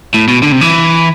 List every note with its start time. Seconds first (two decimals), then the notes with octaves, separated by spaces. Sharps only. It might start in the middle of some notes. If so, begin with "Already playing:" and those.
0.14 A2
0.28 B2
0.42 D3
0.52 C3
0.61 E3